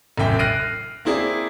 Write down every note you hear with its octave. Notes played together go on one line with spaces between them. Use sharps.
E1 A1 F#2 E5 G5
F6 F#6 A#6 C7 D7 D#7
A#3 C4 E4 G#4 D5